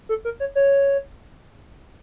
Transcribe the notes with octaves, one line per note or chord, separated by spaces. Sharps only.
A4
A#4
C#5
C#5